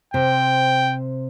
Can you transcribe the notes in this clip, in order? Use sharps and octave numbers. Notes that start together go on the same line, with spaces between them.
C3 C5 G5